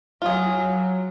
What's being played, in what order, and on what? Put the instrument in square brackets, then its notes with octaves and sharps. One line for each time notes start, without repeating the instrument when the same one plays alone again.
[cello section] F#3 [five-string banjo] F4 G#4